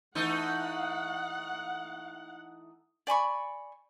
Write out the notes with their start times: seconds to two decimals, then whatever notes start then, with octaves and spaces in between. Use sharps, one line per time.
0.15 E3 A3 D#4 F#5
3.07 D5 G#5 B5 C#6